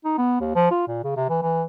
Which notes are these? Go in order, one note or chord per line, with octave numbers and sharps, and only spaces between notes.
D#4
B3
D#2
F3
F4
A#2
C#3
C3
E3
E3